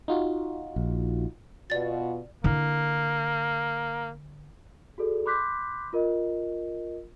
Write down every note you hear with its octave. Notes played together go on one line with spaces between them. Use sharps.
D#4 F4 F#4
A#1
B2 F4 D5 A6
D3 A#3 E4
F#4 G#4 A4 D5
B5 C6 D6 F#6 G6 B6
F4 A#4 D#5